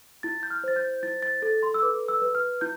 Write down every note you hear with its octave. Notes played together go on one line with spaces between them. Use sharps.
E4 A6
G6
F6
C5 A6
G6
E4 A6
A6
A4 A6
C6
E6
B4 D6
E6
B4
F6
E4 G6